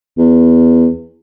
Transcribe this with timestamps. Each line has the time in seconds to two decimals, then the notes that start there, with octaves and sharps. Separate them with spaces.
0.18 E2